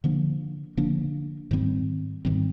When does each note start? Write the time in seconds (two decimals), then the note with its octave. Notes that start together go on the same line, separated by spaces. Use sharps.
0.04 D3 F3 A#3 D4
0.77 D3 F3 A#3 D4
1.51 G#2 D#3 G3 C4
2.25 G#2 D#3 G3 C4